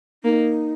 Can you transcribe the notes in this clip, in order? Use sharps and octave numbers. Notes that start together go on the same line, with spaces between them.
A#3 D#4